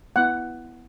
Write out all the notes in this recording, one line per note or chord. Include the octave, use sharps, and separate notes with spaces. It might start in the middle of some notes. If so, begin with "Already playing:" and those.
B3 E4 F#5